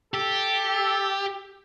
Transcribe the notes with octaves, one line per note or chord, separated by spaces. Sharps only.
G4 A4